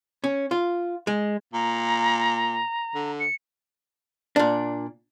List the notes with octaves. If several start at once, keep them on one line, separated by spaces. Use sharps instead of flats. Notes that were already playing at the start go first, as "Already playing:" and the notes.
C#4
F4
G#3
A#2 A#5
D3
C#7
A#2 D4